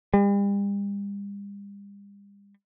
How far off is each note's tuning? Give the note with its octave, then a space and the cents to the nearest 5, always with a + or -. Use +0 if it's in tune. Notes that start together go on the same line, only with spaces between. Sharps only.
G3 +40